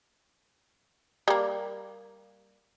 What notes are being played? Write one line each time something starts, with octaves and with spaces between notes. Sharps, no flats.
G3 A#3